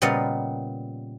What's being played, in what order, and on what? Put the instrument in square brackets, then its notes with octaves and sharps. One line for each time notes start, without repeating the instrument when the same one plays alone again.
[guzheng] A#2 C#3 G3 B3 D#5 F5